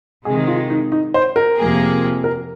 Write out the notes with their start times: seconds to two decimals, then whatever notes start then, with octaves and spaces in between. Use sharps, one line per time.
0.25 C3 D#3 G#3 G#4
0.47 F4
0.70 D#4
0.92 D#4
1.14 C5
1.36 A#4
1.57 F2 C3 F3 A#3 G#4
2.24 A#4